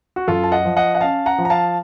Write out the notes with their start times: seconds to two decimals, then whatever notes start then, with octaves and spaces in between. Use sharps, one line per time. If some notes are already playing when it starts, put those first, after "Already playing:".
0.16 F#4
0.28 F#2 F4 A4
0.44 A5
0.52 D#5 F#5
0.65 F3
0.77 D#5 F#5
0.95 F#5
1.01 C#4 F5 A5
1.26 F#5 A#5
1.38 F3
1.45 A#5
1.50 F5 A5